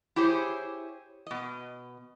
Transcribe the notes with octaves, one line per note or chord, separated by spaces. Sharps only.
E4 G4 G#4 C5 C#5
B2 D#5